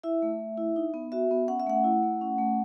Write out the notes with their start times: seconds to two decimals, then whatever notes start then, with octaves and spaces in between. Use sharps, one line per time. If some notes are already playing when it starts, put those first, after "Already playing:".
0.03 E4 E5
0.22 A3
0.40 A3
0.58 E4
0.76 D#4
0.94 B3
1.12 F#4 E5
1.31 B3
1.48 C#4 F#5
1.60 E5
1.67 A3 F#5
1.84 E4
2.03 A3
2.21 C#4
2.38 A3